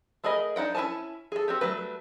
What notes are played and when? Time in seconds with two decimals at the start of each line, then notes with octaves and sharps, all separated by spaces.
0.24 A3 G#4 A#4 D#5 B5
0.56 D4 D#4 F#5 G5
0.75 C#4 E4 B4 G#5 A5
1.32 G#4 A4
1.48 C4 F#4 G4
1.61 F#3 G3 A3 B4